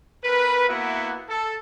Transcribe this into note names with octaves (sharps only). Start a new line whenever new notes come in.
C4 A#4 B4
A#3 B3 E4 F#4 E5
A4